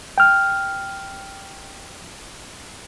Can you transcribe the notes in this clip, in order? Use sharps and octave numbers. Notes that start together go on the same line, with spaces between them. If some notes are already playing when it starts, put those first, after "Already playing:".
G5 F6